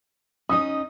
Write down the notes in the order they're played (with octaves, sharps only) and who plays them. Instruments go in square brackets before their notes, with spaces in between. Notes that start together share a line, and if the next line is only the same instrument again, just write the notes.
[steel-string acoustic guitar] C#4 D#4 D#5 [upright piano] D#6